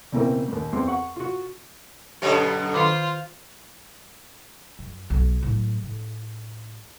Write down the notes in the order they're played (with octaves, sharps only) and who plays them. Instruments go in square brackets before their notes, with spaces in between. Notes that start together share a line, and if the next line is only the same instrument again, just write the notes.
[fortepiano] C#2 B2 E3 A#3 C4
D#2 A#2
E2 C4 C6
F#5 C#6
F4 F#4
[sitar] F#2 B2 D3 [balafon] G4 C#5
[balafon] D#3 D6 [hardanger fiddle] F4 C5
[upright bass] F#2
B1 A#3
A2 F#3
A2